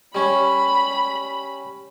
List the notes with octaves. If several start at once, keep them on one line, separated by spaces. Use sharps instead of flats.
G3 C#4 B5